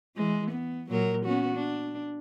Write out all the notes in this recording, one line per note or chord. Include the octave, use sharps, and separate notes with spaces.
E3 G#3
B3
A#2 F#3 A#4
B3 C#4 F#4
D4